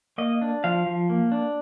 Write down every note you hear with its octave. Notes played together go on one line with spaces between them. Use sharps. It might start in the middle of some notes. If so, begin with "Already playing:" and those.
A#3 D#5
D4
F3 F5
F3
A#3
D4